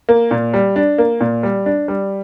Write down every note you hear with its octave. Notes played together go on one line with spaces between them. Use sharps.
A#3
A#2
G3
D4
A#3
A#2
G3
D4
G3